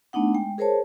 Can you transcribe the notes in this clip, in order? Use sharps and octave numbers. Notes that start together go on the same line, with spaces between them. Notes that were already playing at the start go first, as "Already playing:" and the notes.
A3 B3 D4 D#4 F#5
G#3 G5
G#4 A#4 C5 C#5 A5